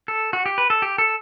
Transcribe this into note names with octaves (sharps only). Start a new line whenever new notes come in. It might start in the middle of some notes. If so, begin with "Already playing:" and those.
A4
F#4
G4
B4
A4
G4
A4